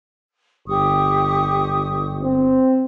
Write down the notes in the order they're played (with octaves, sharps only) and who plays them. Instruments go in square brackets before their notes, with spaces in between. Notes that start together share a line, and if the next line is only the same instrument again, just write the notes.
[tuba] G1 [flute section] G4 C#6 D#6
[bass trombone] C4